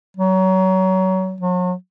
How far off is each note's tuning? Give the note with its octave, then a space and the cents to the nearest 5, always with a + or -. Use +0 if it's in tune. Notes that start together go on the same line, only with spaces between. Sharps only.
F#3 +25
F#3 -40